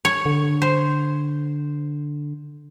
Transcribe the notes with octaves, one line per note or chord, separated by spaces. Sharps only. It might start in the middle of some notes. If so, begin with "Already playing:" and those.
C#5
D3
C5